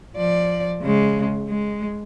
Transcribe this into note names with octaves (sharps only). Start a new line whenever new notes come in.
F3 D5
C#3 G#3
G#3